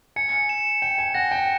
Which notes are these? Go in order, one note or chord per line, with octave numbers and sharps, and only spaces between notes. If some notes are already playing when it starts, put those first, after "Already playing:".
G#5 C#7
E7
G5 E7
G#5
F#5 A#6
G5